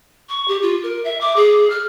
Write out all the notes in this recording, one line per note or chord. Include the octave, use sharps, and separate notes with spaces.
C#6
G4
F4
A#4
E5
D6
G#4
F6